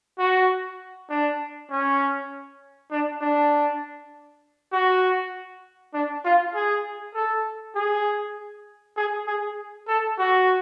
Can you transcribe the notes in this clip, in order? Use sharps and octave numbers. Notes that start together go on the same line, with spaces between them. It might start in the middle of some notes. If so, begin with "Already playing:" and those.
F#4
D4
C#4
D4
D4
F#4
D4
F4
G#4
A4
G#4
G#4
G#4
A4
F#4